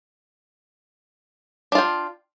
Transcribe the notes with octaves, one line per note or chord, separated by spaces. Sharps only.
D4 F4 G5